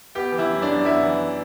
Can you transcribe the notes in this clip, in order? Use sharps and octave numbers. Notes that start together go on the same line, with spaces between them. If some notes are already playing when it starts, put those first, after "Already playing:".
B3 G4 G5
E3
E4 E5
F#2
D4 D5
F#2
B3 E4 E5
E3